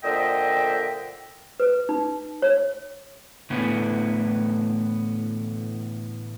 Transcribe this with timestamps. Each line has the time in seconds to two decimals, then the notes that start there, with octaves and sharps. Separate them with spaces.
0.03 A#2 D3 C5 D#5 E5 G5
1.60 B4
1.89 D#4
2.42 C#5
3.50 A2 D3 E3 A3 B3